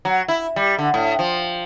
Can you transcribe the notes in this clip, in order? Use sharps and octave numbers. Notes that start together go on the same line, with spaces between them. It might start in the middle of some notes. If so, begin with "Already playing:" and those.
F#3
E4
G3
D3
A2
F3